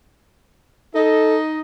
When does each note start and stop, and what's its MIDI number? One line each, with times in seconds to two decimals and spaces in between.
0.95 1.60 63
0.95 1.37 69
0.95 1.60 75